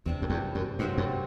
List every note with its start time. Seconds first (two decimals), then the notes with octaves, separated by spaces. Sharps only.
0.06 E2 C3 G3 D4
0.22 F#2
0.30 E2
0.55 F#2
0.79 G2 C3 F#3 C4 G4
0.98 F#2